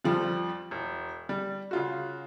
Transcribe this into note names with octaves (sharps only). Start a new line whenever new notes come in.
F2 F3 G3
E1
G3
C#3 F4 F#4